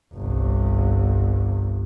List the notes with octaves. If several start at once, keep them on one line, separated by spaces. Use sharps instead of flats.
G1 C2